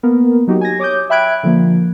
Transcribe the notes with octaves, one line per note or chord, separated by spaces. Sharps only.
A#3 B3 A#4
F#3 D#4 F#4 G4
G#5 G#6 A#6
C#5 D6 D#6 G6
E5 G5 B5 F#6 G#6 D7
D3 F3 A#3